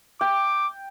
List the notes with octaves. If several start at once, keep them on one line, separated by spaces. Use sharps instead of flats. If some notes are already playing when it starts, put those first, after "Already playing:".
G5 D6